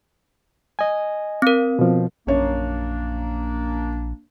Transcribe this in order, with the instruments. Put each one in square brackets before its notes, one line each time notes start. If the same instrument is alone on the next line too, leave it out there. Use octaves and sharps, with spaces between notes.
[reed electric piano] D#5 G#5
[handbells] C4 A#4
[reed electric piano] B2 F3
[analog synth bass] A#1 [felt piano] F#2 C#5 [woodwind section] A#3 D4